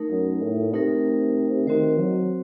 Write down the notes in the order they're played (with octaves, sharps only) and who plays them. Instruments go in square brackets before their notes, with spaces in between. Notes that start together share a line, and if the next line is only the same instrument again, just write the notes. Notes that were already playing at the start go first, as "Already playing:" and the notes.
Already playing: [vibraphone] A3 D#4 A#4
[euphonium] F#2
A2
[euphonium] C3 [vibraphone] A3 D#4 A#4
[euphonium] D#3 [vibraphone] C4 F#4 C5
[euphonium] F#3